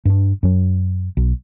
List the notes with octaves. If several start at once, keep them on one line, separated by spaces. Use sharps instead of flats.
G2 D4
F#2 F#3
B1